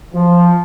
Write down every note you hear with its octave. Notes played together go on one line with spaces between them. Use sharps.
F3